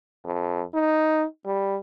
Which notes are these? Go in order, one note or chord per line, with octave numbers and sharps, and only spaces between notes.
F2
D#4
G3